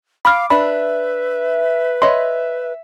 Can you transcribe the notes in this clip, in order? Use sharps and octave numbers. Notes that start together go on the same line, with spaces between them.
F5 B5 D6 F6
D4 B4 E5 B5
C#5 D#5 E5 B5 C6